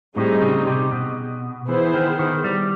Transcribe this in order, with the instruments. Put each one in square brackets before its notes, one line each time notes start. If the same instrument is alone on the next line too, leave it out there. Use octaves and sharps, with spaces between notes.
[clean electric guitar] A2 [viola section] G3 C4 D#4 G#4
[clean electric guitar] C#3
C3
B2
[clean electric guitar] E3 [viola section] B3 E4 G#4 C5
[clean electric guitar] D#3
D#3
G3